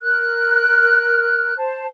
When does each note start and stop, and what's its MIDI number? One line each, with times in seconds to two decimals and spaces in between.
0.02 1.55 70
0.02 1.55 89
0.02 1.55 90
1.57 1.87 72
1.57 1.87 81